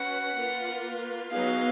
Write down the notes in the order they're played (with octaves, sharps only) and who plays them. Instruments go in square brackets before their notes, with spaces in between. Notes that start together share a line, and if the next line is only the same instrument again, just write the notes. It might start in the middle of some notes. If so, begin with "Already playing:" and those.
Already playing: [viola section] C#4 F#4 B4 [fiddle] F#5
[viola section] A#3 F4 B4
[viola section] F#3 B3 D#4 G#4 B4 [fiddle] F5